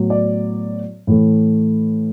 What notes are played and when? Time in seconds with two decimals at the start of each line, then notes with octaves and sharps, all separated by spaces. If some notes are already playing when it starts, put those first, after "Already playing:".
Already playing: A2 F#3 B3
0.10 D5
1.07 A2 E3 A3